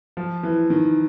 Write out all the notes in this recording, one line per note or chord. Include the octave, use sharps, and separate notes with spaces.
F3
E3
D#3